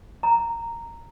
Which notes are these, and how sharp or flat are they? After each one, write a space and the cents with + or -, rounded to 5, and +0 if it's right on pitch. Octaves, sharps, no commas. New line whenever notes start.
A#5 -10